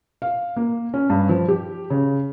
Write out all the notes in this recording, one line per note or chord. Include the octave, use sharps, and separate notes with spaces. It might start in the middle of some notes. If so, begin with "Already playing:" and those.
F5
A#3
C#4
G2
F3
G4
C#3